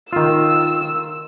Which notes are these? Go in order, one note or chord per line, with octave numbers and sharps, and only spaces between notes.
D#3 F4 E6